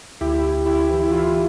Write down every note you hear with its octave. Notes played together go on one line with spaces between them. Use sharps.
D2 E4 G4
D2
D2 E4 G4
E3
E4
E3 F4